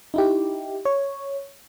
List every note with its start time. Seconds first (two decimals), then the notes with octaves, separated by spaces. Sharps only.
0.14 D#4 E4 G4
0.85 C#5